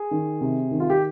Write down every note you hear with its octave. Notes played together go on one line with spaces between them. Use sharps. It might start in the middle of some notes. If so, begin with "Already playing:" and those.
Already playing: G#4
D#3
C3
D#3
F4
G4